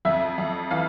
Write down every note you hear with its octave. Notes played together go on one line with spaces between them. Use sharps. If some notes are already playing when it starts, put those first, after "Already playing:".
F2 E5
F2
E3 F5